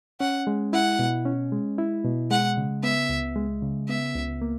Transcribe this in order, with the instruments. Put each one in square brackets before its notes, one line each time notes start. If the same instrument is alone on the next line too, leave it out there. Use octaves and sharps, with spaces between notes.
[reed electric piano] C#4 [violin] F#5
[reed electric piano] G#3
[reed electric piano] E4 [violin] F#5
[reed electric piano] B2
C#4
G#3
E4
B2
[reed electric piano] G#3 [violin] F#5
[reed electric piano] C#3
[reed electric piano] B3 [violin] E5
[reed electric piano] C#2
G#3
C#3
[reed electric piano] B3 [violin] E5
[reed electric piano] C#2
A#3